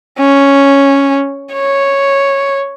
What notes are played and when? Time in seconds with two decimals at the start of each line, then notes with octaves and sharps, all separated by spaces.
0.19 C#4
1.53 C#5